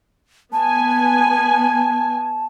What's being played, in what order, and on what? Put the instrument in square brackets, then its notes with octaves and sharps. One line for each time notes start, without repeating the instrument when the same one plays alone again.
[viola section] B3 G#5 [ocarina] A5